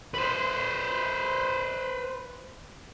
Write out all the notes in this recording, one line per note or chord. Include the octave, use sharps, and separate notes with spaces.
B4 C5